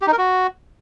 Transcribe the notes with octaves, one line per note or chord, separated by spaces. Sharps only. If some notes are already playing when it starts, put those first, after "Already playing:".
G4
D#4
A#4
F#4